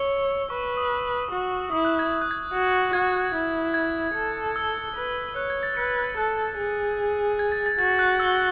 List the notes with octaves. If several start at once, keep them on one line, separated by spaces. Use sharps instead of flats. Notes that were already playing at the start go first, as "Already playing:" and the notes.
Already playing: C#5 E6
B4 C#6
C#6
D#6
F#4
E4 D#6
F#6
G#6
G#6
F#6
G#6
F#4
F#4 G#6
E4
G#6
A4
E6
B4
C#5 F#6
G#6
A6
B4 C#7
A6
G#6
A4 F#6
G#4
G#6
A6
A6
F#4 A6
F#6
E6